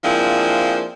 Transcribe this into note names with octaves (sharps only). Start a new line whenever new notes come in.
F3 G#3 A#3 C4 D4 E4